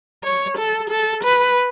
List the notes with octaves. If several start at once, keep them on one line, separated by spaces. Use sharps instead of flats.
C#5
A4
A4
B4